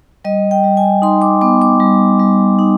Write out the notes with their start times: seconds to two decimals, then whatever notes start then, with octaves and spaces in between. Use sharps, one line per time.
0.25 G3 D#5
0.51 G5
0.64 G3
0.77 G#5
1.02 D#4 C6
1.22 D6
1.41 B3 D6
1.62 D6
1.80 G3
2.19 G3
2.59 D#4